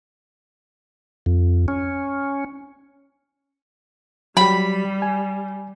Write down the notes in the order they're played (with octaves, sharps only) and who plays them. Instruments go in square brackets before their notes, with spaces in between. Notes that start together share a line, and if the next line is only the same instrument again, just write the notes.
[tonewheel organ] F2
C#4
[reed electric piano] F#3 G4 [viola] G3 [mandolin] B5
[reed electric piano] G#5